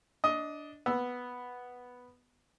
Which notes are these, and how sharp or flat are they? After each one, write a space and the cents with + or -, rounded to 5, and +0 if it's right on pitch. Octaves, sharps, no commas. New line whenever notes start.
D4 +0 D#5 +15
B3 +0 E6 +0